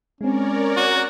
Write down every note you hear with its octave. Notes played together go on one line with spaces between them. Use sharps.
G#3 C4 C#4 A#4 C#5 D5
F#4